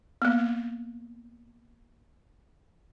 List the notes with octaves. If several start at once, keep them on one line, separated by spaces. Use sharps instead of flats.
A#3 B3